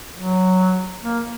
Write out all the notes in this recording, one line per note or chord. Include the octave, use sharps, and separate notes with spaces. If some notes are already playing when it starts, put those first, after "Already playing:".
F#3
A#3